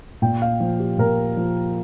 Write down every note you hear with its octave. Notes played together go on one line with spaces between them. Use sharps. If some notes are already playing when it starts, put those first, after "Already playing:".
A#2 G5
F5
F3
G4
A#2 A#4
F3